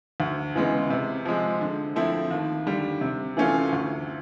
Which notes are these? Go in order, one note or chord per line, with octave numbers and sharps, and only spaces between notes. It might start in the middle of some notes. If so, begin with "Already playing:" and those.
D2
C#3 E3 G#3 B3
C3
F3 G#3
D3
F3 A3 C4 E4
D#2
D3 G3
C3
E3 A3 C#4 F4
D2